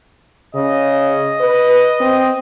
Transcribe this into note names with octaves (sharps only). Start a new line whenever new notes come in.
C#3 D#5
B4
C4